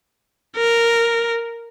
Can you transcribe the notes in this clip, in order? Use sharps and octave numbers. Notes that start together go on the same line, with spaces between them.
A#4